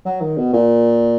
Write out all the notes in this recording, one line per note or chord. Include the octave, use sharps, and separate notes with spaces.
F#3
D#3
B2
A#2